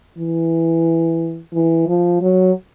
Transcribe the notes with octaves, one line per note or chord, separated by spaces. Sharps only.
E3
E3
F3
F#3